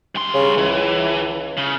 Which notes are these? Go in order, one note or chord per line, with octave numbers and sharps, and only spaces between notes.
G2 C6
C#3
C#2 E3
C#3